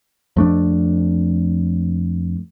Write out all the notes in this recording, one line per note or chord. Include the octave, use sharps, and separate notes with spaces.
F2 A3 D4